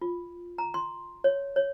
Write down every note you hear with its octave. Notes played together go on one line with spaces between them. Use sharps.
F4
A#5
C6
C#5
C#5